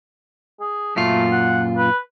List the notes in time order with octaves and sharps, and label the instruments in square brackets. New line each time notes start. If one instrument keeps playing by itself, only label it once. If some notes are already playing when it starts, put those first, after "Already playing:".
[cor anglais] G#4
[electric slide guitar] F#2 A#2 F4 [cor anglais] A3
[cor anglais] F#5
B4